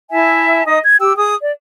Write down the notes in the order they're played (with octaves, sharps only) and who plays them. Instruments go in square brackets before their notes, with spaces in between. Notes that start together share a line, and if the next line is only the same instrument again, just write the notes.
[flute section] E4 E5 G#5 A5
D#4 D#5 D#6
G#6
G4 G5 E6
G#4 D#6
D5